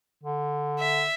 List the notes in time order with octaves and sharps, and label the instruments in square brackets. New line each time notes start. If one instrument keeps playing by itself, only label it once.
[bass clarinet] D3
[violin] E5